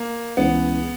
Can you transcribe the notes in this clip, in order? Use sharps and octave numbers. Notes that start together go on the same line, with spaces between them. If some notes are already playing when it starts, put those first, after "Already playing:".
Already playing: A#3
C#2 C#3 E3 B3